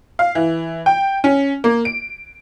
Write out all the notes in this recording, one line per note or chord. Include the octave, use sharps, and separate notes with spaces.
F5
E3
G5
C#4
A#3
D7